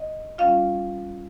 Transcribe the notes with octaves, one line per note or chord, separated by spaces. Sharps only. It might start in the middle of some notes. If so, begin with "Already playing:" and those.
Already playing: D#5
G3 C#4 F4 F5